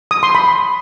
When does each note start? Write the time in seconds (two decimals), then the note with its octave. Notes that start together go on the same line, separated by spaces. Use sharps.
0.11 D#6
0.23 C6
0.35 B5